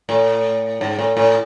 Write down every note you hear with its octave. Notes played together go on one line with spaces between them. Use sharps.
A2
G#2
A2
A2